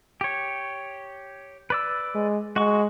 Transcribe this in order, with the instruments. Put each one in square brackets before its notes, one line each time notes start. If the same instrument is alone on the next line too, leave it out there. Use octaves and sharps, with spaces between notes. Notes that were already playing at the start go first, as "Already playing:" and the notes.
[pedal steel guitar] G4 C#5
B4 D5 E6
[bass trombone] G#3
[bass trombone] G#3 [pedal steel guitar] F#4 C#6